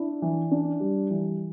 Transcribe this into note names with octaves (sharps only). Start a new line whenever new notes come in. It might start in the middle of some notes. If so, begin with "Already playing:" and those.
Already playing: D4 E4
E3
D4
G3
E3